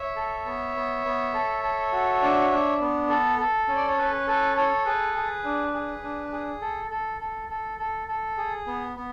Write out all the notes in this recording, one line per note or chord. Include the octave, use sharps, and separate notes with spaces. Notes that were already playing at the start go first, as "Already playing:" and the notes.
Already playing: C#5 E5
A4
B3
B3
B3
A4
A4
F#4
D4
D4
B3
A4
A4
C#4
D5
C#5
C#4 B4
A4 B4
A4 C#5
G#4 B4
G#4
D4
G#4
D4
G#4
A4
A4
A4
A4
A4
A4
G#4
B3
B3